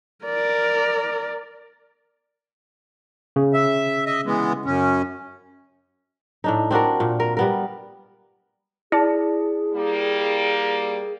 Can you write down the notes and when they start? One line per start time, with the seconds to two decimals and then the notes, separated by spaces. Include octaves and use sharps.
0.24 A#4 D5
3.36 C#3
3.54 E5
4.06 D#5 E5
4.26 E3 G#3 B3
4.65 F#2 C#4
6.44 A2 D4 D#4
6.71 C4 D4 F#4 A#4
7.00 A#2
7.20 A#4
7.37 G3 B3 A#4
8.92 E4 G#4 D5 A5
9.74 G3 A#3